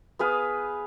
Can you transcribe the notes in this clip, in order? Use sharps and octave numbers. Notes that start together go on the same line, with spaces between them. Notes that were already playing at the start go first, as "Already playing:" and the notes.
B3 G#4 B4 F5